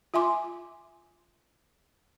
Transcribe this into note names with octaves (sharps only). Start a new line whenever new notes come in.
F4 E5 G#5 C6 D6